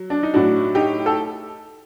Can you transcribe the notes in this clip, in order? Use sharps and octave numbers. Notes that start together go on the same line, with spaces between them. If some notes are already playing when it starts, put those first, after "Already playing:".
Already playing: F#3
D4
D#4
A2 F#3 D4 F#4
D#4 G4
A4